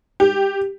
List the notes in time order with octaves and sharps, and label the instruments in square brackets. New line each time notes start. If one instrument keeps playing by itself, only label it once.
[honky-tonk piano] G4